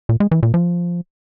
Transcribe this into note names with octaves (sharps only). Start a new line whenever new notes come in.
A#2
G#3
E3
A#2
F3